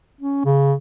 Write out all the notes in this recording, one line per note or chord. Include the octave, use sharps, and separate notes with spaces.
C#4
C#3